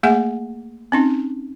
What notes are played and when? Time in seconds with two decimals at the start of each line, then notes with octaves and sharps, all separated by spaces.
0.03 A3 A#3 G#4 E5 F#5 G#5
0.92 C4 C#4 D#4